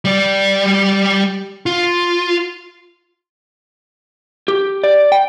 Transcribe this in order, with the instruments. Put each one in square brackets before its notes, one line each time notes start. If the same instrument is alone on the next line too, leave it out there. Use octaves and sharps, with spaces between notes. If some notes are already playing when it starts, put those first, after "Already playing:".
[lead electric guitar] G3 D5
F4
[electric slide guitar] G4
D5
G5